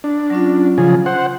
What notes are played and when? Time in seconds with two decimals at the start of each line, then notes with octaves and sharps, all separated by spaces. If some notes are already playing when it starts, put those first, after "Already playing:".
0.04 D4
0.30 F#3 C#4 F4
0.78 C#3 F3 G#4
1.06 C5 F#5